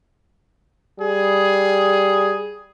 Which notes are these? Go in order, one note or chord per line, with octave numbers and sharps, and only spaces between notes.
G3 G#4